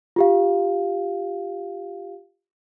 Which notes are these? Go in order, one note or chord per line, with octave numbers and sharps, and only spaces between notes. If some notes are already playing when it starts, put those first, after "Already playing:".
F4 G4 F5